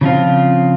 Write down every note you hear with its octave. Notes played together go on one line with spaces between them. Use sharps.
C#3 F3 C4 F4